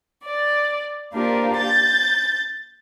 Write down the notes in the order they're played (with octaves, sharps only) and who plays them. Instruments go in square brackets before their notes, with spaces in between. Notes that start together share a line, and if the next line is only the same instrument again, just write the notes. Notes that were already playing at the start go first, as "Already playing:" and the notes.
[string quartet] D5
A#3 D4 F4 G4 A#4 C5
G6 A6